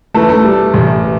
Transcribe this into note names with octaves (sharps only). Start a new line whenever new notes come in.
E3 A3
A3
G3
A1